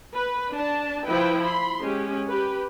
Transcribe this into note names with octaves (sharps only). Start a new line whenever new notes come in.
B4
D4 A5
F3 E4 B4 G5
B5 C6
G#3 C#4 G4
G4 B4